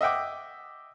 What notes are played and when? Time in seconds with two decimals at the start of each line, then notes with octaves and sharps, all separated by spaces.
0.01 D#5 E5 F#5 G5 D6